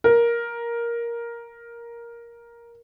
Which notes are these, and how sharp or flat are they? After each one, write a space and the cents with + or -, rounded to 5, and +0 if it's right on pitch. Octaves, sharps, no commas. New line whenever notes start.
A#4 +10